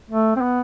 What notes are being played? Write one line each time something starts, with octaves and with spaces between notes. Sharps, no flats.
A3
C4
B3